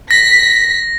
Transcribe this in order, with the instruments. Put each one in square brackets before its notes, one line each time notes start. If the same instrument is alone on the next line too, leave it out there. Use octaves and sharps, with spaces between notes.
[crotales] A#6 [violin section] B6